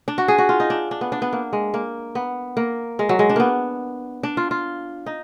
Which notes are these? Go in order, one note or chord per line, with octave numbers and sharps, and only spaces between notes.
D4
F#4
G#4
F#4
F4
D#4
D4
D4
B3
D4
B3
A#3
G#3
A#3
B3
A#3
G#3
F#3
G#3
D4
A#3 B3
D4
F4
F4
D#4